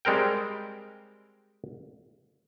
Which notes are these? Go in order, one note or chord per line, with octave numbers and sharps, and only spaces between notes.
G3 G#3 C4 A#4 G5